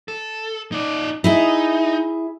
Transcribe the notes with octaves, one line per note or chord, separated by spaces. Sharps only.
A4
D#4 D5
D#4 E4 G#4 E5